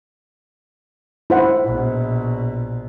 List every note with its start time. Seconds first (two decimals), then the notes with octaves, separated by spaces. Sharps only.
1.30 E4 C5 F#5
1.64 A#1 B2